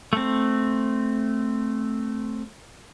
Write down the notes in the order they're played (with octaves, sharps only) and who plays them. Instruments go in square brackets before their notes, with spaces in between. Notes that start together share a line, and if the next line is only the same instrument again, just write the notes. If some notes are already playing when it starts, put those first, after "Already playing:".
[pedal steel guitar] A3 C4